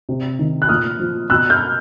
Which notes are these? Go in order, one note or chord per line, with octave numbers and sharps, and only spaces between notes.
C3
D#3
F#6
A#2 D#6 F6
F3
B2 E6 F#6
F6 G6